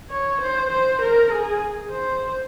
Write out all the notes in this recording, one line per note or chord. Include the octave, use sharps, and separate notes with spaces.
C#5
C5
C5
A#4
G#4
C5